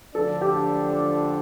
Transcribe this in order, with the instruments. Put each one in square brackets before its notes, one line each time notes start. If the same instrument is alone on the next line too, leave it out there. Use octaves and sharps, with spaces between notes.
[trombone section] D3 F3 A3 D4 [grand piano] A4
[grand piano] G4